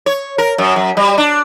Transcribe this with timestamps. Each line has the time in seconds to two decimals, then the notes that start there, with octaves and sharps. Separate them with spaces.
0.06 C#5
0.38 A#4
0.58 F#2
0.76 F#2
0.97 G3
1.18 D4